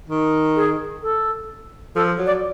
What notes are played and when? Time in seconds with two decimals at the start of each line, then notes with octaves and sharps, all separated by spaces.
0.09 D#3
0.56 G#4
1.02 A4
1.95 F3 A4
2.18 F#3
2.26 D5